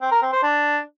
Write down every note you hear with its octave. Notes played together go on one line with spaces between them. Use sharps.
C4
A#4
C4
C5
D4